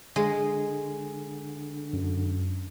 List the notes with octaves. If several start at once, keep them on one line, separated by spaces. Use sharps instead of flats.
D3 G#3
F#2